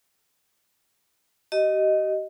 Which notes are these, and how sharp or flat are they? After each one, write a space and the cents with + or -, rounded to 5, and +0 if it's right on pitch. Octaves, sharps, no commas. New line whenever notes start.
G4 -40 D#5 +0